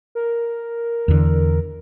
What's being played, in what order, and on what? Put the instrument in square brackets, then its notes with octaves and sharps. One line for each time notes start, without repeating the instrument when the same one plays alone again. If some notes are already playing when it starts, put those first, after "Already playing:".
[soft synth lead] A#4
[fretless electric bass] E2 D3